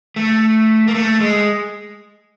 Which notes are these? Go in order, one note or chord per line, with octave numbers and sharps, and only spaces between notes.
A3
A#3
A3
G#3